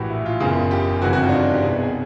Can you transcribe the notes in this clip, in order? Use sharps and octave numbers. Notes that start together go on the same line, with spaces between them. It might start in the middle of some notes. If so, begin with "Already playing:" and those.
Already playing: A#1 A2 E3 F#4 G4
E4
F4
F#1 E2 C#3
G4
G1 F2 C#3 E3 F#4
F#4
F4
D4
D#4
G4
C2 B2 G#4
G#4